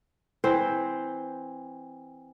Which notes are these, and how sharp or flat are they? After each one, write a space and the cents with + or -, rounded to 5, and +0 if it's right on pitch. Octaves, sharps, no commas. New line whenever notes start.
E3 +0 C4 +0 C5 +0